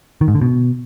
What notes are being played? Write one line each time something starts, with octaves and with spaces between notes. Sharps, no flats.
D#3
G#2
D3
B2